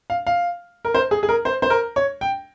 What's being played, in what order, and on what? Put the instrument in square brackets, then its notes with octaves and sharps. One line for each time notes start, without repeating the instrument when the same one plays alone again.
[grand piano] F5
F5
A#4
C5
G#4
G#4
A#4
C5
C5
A#4
C#5
G5